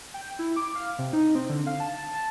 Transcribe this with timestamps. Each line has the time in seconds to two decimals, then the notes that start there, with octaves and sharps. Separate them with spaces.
0.14 G5
0.39 E4
0.56 D6
0.75 F5
0.99 C3
1.13 D#4
1.35 C4
1.50 D3
1.67 F5
1.80 A5
1.98 A5
2.14 A5